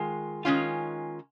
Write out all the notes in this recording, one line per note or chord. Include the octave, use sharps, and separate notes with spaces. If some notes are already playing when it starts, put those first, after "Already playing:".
Already playing: D#3 G#3 F4
D#3 G#3 C#4 F4